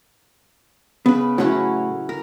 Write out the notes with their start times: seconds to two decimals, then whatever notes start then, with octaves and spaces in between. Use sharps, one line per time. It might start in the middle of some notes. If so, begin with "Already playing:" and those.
1.06 C#3 B3 B4
1.38 A2 F#3 A3 C#4 E4 F#5
2.09 A#4